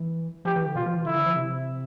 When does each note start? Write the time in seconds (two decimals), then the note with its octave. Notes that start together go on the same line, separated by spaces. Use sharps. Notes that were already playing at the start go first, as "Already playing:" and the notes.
Already playing: E3
0.45 F3 G4
0.56 E3
0.66 D3
0.75 B2 F4
0.86 F3
0.96 E3
1.05 D3 E4
1.15 D3
1.26 F3
1.36 C3